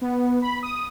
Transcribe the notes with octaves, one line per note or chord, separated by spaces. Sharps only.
B3
B5
D#6